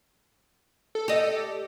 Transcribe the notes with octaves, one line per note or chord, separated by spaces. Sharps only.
A4
G4 D#5